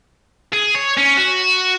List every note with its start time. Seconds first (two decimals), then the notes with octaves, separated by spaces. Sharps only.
0.52 G#4
0.75 C#5
0.97 C#4
1.17 F#4